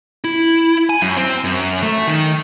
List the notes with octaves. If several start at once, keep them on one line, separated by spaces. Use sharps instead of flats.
E4
G#5
F#2
C4
F#2
A3
D#3